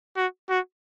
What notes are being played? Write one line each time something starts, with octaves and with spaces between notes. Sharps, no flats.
F#4
F#4